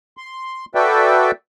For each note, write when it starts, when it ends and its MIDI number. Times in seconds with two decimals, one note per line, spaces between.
0.17 0.65 84
0.75 1.31 66
0.75 1.31 69
0.75 1.31 71
0.75 1.31 74
0.75 1.31 76
0.75 1.31 79